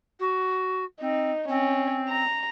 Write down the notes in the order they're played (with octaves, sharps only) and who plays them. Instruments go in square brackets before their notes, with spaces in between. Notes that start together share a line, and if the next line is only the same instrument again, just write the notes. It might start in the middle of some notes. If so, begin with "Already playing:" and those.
[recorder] F#4
[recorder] C4 [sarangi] D#4
[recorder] C4 [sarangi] C#4
[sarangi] A#5